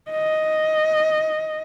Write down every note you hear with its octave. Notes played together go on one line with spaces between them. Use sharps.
D#5